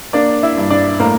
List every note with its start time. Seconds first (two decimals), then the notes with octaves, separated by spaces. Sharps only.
0.13 A#3 D4 D5
0.43 E4 E5
0.57 G2
0.70 D4 D5
1.00 A2 A#3 A#4